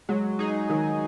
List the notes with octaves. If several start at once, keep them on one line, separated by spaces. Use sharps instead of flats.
F#3 G#3
D#4 G#4
D#3 F#3